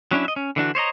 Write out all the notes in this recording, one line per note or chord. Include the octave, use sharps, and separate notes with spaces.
F#3 C#4 D4 E4
D#5 E5
C#4
D3 E3 D4 F#4
C5 C#5 D#5 A#5